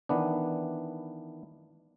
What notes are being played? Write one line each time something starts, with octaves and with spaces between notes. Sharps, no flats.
D#3 E3 B3 D4